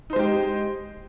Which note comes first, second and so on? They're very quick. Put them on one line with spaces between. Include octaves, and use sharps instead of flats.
D#4 C5 G#3 G4